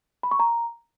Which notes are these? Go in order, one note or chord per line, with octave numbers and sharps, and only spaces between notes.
B5
C#6
A#5